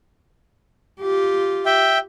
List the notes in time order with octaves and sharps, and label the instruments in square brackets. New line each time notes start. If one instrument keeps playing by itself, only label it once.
[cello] F4 G4
[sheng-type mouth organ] E5 G5